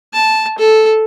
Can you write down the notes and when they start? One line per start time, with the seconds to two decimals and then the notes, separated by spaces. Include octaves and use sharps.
0.13 A5
0.59 A4